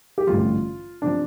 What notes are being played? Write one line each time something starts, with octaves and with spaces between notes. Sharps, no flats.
G4
A1 G2 D3 F3 F4
C3 F3 D4